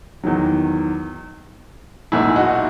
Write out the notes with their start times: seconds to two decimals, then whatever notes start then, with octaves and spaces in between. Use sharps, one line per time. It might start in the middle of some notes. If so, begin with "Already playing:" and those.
0.24 E2 D#3 F#3
2.12 B1 A#2 G#3 E4 G#4
2.36 D#4 F#4